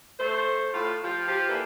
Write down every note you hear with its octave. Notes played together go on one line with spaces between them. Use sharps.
A3 C5
A2 F4
F3 F4 G4
F3 G4
E3 A#3 E4 A4 B4 D5